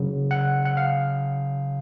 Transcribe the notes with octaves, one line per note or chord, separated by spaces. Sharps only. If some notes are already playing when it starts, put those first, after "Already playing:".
Already playing: C#3 F#3
F#5
F#5
F5